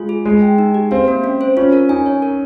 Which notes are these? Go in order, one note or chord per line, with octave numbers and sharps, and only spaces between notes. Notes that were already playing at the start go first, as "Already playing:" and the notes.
Already playing: G#3 F4
G#4
G#3 G#4
G5
D#4
G4
C4 F5
A#3
C#4
C5
C#4 F4
A#4
D#4 G#5
C#5
A#4